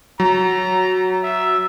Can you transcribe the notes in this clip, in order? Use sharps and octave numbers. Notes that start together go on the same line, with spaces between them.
F#3 A#5
E5